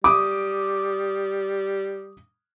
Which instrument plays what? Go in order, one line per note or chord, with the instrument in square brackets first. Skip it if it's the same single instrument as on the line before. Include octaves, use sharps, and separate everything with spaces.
[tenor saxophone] G3 [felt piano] D6 D#6